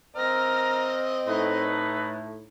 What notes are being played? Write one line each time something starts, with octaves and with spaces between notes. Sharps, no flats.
C4 A#4 D#5 F6 A#6
A2 D#4 B4